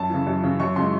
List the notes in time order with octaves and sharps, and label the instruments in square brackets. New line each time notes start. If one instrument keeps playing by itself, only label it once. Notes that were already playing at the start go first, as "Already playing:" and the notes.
Already playing: [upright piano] F#2 A5
C#3 E3
F#2
C#3 E3
F#2 C#6
C#3 E3 G#3 C6